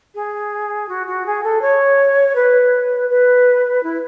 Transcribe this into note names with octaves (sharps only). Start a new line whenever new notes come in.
G#4
F#4
F#4
G#4
A4
C#5
B4
B4
E4